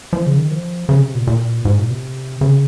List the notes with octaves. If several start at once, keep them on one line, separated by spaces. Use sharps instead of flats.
F3
C#3
D#3
F3
C#3
C3
A#2
A#2
G#2
A#2
C3
C#3